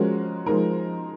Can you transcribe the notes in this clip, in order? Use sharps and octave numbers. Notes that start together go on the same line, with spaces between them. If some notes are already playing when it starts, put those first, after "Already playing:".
Already playing: F3 G#3 C#4 F#4 A#4
F3 G#3 D#4 A#4